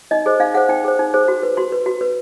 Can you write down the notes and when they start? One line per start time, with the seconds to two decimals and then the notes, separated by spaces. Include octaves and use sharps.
0.11 D#4 D#5
0.26 G#4 C5
0.40 D#4 F5
0.54 G#4 C5 F#5
0.69 D#4 G5
0.84 G#4 C5
0.99 D#4
1.14 G#4 C5
1.28 F#4
1.43 B4
1.57 F#4 C6
1.72 B4
1.86 F#4
2.01 B4